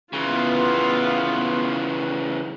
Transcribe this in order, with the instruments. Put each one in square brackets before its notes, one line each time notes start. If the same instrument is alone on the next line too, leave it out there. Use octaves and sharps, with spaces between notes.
[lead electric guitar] C#3 E3 [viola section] B3 F4